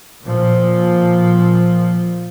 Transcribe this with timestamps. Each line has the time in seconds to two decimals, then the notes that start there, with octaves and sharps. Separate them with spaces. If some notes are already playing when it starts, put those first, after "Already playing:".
0.22 A#2 F3